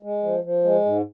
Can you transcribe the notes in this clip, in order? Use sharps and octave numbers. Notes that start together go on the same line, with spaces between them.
G#3
F3
F3
G#3
G#2